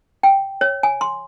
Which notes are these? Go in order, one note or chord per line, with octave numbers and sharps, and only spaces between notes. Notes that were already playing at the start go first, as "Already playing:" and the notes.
G5
C#5
G#5
C6